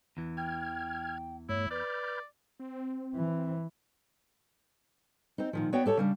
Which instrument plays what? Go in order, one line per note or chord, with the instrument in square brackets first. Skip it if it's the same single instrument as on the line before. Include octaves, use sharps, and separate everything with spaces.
[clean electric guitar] E2 E3
[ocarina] G5 [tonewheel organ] F6 G#6
[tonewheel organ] G2 A3 [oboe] E4 [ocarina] C#5
[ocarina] B4 [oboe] D5 [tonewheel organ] B5 F6 G6
[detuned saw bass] C4
[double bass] E3
[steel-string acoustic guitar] C4 D#4
A#2 D#3 F3
B3 F#4 C#5 D5 G5
G4 A4 C#5 F#5 A5
C#3 G3 D4